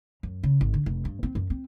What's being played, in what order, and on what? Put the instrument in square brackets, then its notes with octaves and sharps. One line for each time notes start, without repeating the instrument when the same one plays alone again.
[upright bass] F#2
C#3
G#1
D3
F1
G2
C4
F#2
C4